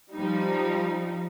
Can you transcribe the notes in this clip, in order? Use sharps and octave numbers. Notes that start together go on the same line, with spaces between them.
F3 G3 D#4